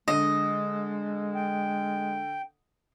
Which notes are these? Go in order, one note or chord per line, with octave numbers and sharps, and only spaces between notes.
D3 G#3 D#5
G5